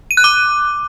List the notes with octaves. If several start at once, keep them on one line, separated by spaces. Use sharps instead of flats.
D#7
F#6
D6